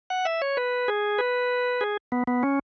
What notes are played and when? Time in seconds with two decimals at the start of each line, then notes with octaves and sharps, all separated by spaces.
0.10 F#5
0.25 E5
0.42 C#5
0.57 B4
0.88 G#4
1.18 B4
1.81 G#4
2.12 B3
2.27 B3
2.43 C#4